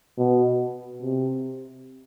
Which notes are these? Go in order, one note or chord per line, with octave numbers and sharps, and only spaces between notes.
B2
C3